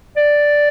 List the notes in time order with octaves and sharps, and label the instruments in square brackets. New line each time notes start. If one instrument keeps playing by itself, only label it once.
[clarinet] D5